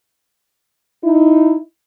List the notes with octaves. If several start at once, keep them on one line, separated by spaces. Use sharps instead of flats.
D#4 E4